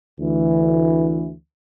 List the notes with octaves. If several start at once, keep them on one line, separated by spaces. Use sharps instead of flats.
D2 E3